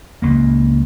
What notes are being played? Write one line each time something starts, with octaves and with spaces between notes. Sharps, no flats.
C#2 A#3